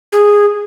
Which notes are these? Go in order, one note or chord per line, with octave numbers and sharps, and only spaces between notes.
G#4